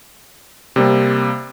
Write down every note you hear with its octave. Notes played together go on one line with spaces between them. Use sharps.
C3 G3 A#3 C4